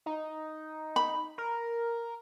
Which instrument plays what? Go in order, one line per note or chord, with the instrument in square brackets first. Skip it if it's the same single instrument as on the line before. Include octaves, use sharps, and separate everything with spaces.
[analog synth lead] D#4
[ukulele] B5
[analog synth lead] A#4